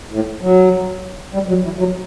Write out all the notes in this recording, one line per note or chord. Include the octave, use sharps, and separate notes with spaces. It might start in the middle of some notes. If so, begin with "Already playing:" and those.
A2
F#3
G3
F#3
E3
F#3